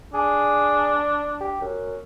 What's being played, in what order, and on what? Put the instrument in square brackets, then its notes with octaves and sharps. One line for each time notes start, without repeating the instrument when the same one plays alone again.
[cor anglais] D4 [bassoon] G#4
[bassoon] G4
F#2